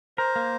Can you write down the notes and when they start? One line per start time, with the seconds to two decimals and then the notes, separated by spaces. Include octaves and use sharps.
0.18 A#4 C5
0.36 A#3